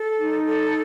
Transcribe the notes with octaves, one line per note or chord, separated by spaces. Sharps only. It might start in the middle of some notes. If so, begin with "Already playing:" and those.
Already playing: A4
D#4
A4